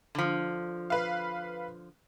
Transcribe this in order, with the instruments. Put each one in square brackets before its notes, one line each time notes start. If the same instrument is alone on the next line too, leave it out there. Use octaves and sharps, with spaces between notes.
[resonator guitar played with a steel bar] D3 F3
[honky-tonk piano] B4 F5